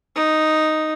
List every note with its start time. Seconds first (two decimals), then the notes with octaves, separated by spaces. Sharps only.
0.16 D#4